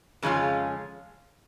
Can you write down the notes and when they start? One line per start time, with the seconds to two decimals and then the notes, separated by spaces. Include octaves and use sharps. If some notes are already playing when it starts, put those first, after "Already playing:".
0.23 F2 C#3 G#3 C#4 F4